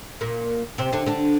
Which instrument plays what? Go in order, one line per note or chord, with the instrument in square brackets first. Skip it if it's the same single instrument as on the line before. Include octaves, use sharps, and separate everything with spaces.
[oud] A#2 A#3
C3 C4
D3 D4
D3 D4